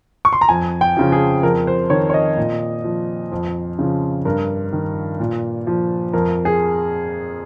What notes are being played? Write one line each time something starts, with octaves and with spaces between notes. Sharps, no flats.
C#6
C6
A#5
F2 G#5
G5
C#3 F3
G#4
F2 A#4
C5
D#3 C#5
C#5
D#5
A#2
F3
F2
C#3 F3
G2 A#4
D#3
A#2
F3
F2 A#4
G#4